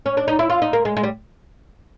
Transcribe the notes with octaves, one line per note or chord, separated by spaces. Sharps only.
C#4
D4
D#4
E4
F4
D#4
A#3
G#3
G#3
G3